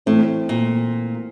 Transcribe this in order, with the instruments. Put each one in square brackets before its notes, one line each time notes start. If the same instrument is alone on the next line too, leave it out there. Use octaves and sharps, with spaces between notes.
[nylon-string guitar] A2 [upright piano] E3 A3 C4
[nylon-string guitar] A#2